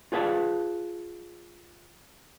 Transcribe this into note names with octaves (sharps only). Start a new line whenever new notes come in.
F4 G#4 B4 F5 A5